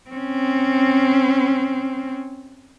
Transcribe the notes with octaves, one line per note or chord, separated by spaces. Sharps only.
C4 C#4